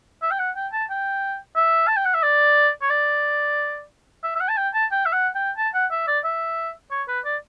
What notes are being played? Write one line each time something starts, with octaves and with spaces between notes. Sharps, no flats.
E5
G5
F#5
G5
A5
G5
E5
A5
G5
F#5
E5
D5
C#5
D5
E5
E5
F#5
A5
G5
A5
G5
E5
F#5
G5
A5
F#5
E5
D5
E5
C#5
B4
D5